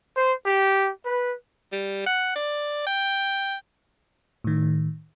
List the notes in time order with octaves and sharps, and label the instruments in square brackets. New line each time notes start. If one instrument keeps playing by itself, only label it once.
[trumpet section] C5
G4
B4
[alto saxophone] G3
F#5
D5
G5
[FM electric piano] A2 D#3